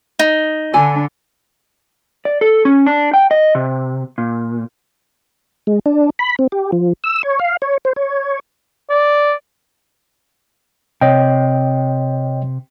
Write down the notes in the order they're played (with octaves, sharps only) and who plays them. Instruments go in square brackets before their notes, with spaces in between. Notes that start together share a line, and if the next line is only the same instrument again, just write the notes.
[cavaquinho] D#4
[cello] D3 D4 [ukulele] A4 G#5 B5
[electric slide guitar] D5
A4
C#4
D4
G5
D#5
C3
A#2
[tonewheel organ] G#3
D4
B5
C4
G4
F3
E6
C#5
F5
C#5
C5
C#5
[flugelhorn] D5
[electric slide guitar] C3 [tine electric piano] C#5 D#5 G5